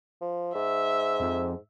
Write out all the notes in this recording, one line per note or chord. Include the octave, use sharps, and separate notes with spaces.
F3
G#2 E5
F2